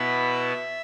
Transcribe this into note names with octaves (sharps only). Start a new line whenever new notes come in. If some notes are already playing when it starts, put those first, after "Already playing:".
Already playing: B2 B3 E4 E5